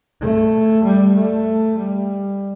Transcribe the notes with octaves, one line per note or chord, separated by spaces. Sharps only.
A3
G3
A3
G3